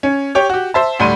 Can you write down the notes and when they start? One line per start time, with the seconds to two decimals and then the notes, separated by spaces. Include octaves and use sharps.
0.03 C#4
0.35 G4 C#5 G5
0.49 F#4 G4
0.74 C5 E5 A5
0.99 D2 A2 G3 C6 D#7